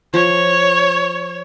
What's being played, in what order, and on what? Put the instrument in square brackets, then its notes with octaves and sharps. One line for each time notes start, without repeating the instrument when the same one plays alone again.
[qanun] F3 [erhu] C#5